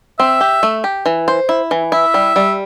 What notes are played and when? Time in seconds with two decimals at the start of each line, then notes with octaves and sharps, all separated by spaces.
0.19 C4 E5
0.41 G4
0.63 A3
0.84 G4
1.06 E3
1.28 C5
1.49 E4
1.71 E3
1.92 E4 E5
2.14 G3
2.36 G3